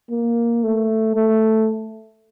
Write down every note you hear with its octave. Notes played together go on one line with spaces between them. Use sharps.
A#3
A3
A3